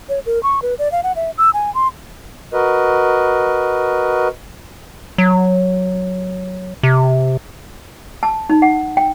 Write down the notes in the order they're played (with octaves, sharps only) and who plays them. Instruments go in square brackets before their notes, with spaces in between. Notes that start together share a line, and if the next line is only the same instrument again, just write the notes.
[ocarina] C#5
A#4
C#6
B4
D5
F5
F#5
E5
E6
G#5
C6
[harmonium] F#4 A#4 B4 D#5
[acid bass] F#3
C3
[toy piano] A5
D#4
F#5
G5